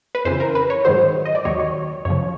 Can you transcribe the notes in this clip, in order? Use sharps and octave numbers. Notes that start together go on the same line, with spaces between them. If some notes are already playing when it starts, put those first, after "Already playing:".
B4
F2 C#3 E3 C5
A#4
B4
C#5
G#2 D#3 F#3 C5
D#5
D5
D#2 D#3 F#3 C#5
C#5
F#2 C#3 F3 C#5